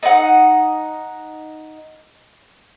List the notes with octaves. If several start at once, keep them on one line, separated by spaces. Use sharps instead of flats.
D#4 F#5